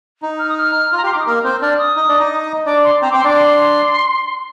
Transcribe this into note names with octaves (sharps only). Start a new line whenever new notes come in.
D#4
F6
D#6
F6
F4
A#5
G4 C6
D6
D#4
D#6
A#3 A#4 F6
C4 C5 G6
D4 D5 F6
F6
D#6
D#4 D#5
D4 D5
D#4 D#5
D4 D5 D6
C6
C4 C5 A#5
D6
C4 C5
C6
D4 D5 D6
C6